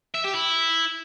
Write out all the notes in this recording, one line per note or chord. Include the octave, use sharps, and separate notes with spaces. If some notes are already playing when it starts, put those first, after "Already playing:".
E5
G4
E4